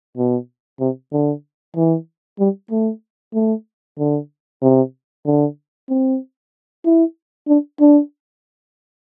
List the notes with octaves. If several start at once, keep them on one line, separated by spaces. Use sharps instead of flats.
B2
C3
D3
E3
G3
A3
A3
D3
C3
D3
C4
E4
D4
D4